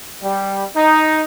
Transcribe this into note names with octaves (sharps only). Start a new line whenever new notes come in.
G3
D#4